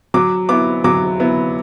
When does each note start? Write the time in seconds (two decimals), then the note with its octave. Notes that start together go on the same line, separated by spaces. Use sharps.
0.14 F#3 D6
0.49 B3 E4 D6
0.84 F#3 D6
1.20 B3 E4